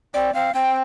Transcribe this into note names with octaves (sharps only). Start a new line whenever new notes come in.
C4 D5
C4 F5
C4 G5